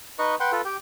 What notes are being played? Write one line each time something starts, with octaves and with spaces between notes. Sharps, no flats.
D#4 B4 D#5 C#6
B4 F#5 G5 C6
F4 A4 B4
G4 G5